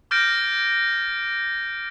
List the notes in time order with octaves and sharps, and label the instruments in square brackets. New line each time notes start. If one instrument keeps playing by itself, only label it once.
[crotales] D6 F6 G6 A6 A#6 D7